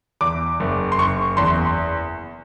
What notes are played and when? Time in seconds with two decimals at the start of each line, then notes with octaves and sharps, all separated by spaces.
0.21 E2 D6
0.60 F#1
0.92 C6
0.98 F#1 C#6
1.37 E2 C6